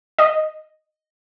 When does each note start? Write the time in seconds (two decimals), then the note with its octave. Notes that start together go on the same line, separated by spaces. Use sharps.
0.19 D#5